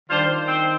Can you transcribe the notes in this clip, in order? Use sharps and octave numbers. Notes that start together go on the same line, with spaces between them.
D#3 G3 D4 F4 C5
C4 C5